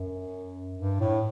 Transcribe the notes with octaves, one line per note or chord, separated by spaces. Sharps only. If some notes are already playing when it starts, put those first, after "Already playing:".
Already playing: F#2
G2
A2